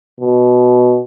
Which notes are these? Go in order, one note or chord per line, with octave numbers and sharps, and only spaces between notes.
B2